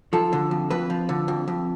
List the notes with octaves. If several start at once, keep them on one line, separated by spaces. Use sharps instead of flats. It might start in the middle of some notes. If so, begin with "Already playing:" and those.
F3 A4
D3
F2
F2 B4
F3
D3
F2
F2